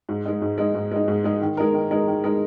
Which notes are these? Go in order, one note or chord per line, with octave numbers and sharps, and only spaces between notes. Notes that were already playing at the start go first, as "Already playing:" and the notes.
G#2
G#3 D#4
G#2
G#3 D#4
G#2
G#3 D#4
G#2
G#3 D#4
D#3
G#3 D#4 A#4
D#3
G#3 D#4 A#4
D#3
G#3 D#4 A#4